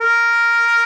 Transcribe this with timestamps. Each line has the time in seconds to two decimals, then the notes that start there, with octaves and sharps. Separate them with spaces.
0.01 A#4